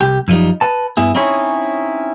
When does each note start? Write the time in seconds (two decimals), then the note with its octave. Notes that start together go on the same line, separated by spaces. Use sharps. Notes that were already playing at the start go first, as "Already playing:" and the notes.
0.01 C2 G4
0.28 F#2 F3 G3 D#4
0.61 B4 A5
0.97 G2 B3 E4 G#4
1.15 C4 C#4 D#4 E4 G#4 C#5